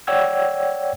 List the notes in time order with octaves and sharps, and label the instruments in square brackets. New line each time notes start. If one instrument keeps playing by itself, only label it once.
[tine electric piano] C#5 D5 F#5 G5 E6 G#6